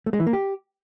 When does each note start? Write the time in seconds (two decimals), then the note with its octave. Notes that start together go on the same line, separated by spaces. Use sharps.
0.06 A3
0.13 G#3
0.20 E3
0.26 A#3
0.33 G4